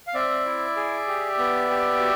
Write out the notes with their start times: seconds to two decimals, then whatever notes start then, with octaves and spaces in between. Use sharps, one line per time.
0.07 F5
0.14 C4 D5 E5
0.46 E4
0.76 G#4
1.08 G4
1.38 B3
1.70 G4
2.00 F#4